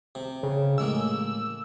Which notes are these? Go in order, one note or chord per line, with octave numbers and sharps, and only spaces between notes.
C3
C#3
A1 G#3 A#3 E6